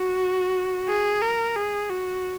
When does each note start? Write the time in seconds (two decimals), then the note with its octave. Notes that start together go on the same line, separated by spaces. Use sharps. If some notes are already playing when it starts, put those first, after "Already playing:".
Already playing: F#4
0.88 G#4
1.22 A#4
1.56 G#4
1.90 F#4